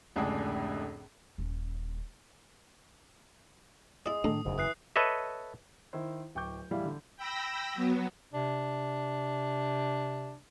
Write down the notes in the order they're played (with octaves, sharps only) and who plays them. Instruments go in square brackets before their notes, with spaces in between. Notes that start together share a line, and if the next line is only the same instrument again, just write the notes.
[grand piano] F1 C#2 A2 D3 D4 G#4
[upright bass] D#1 C#4
[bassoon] G#3 [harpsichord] E4 D5 [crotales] D#6
[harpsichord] A2 [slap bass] D#3 D4
[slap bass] F#1 E2 C#3 [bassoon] G#2
[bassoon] E3 [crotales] D#6 F#6 C7
[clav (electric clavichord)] A4 B4 C#5 D#5 E5
[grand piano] D#3 E4 C5
D1 G5 C#6 D6 G6
A2 E3 G3 F5
D3
[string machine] G5 B5 E6 A#6
F#3 B3
[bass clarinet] C3 [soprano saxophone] D4